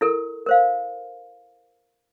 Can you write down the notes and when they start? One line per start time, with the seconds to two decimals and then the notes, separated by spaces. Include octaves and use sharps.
0.01 E4 A4 A#4
0.46 A#4 C5 F5